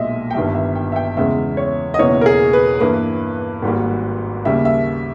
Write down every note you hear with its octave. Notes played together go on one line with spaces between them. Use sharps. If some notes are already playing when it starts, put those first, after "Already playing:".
Already playing: B1 A#2 G#3 D#5 E5
G5
G1 G2 D#3 G3 E5
E5
G5
E5
G5
E2 C#3 G#3 E5
C#5
D#5
E1 E2 C#3 E3 A#3 C#5
A#4
G#4
B4
G2 E3 A#3 B4
G#1 G#2 G3 A#3
D#2 C#3 G3 A#3 E5
E5